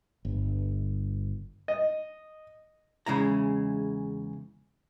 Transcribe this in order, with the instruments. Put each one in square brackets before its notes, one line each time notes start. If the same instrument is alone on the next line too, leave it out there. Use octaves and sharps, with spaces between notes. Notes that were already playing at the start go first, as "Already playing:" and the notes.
[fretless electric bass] G1
[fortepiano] D#5
[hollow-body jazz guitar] E2 C#3 G#3 E4 A#5